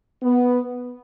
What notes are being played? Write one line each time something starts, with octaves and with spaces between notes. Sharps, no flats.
B3